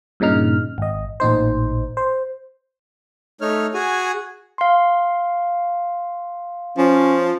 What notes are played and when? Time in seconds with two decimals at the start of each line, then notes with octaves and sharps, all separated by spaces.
0.20 G2 A#2 C#3 D#4 F6
0.78 G#1 D#5
1.20 A1 A#2 D#4 C5
1.97 C5
3.41 A3 D#4 C#5 F6
3.74 F#4 G#4 G#5
4.58 F5 C6
6.78 F3 C#4